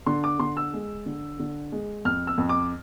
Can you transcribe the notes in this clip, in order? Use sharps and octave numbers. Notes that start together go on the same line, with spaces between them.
D3 C6
D6
D3 C6
E6
G#3
D3
D3
G#3
F2 F6
E6
F2
D6